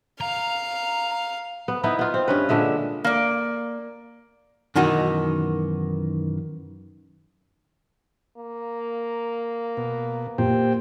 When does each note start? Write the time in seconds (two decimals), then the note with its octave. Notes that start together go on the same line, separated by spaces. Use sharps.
0.21 F5 A#5
1.68 B3
1.84 B3 D#4 E4
1.99 B3 F4
2.14 C4
2.28 G2 C#4 B4
2.49 A#2 D3 G#3 E5
3.04 A#3 D5
4.75 F#2 B2 D#3 E3 D#4 F#4
8.37 A#3
9.77 B2
10.38 A#2 G4 C5 G5